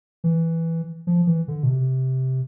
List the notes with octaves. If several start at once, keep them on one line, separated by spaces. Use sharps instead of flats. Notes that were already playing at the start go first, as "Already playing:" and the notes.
E3
F3
E3
D3
B2
C3